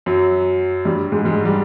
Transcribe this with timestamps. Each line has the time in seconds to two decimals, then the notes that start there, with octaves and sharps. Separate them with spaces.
0.06 F#2 F#3
0.85 G2 G3
1.12 G#2 G#3
1.25 G#2 G#3
1.45 G3